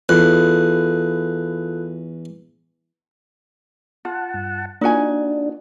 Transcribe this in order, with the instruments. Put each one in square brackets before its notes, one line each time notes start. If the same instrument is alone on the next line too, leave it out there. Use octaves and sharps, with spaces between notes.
[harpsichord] E2 [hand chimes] F4 A4 F#6
[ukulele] F4 [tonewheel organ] F#5 A5
[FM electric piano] G2
[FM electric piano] A#3 F4 [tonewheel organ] D4 [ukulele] D#4 F#4 G#5